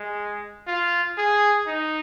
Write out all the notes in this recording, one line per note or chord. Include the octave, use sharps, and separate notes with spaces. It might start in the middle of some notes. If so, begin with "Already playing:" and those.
Already playing: G#3
F4
G#4
D#4